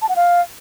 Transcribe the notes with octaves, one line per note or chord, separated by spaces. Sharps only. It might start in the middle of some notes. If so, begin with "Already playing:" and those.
A5
F#5
F5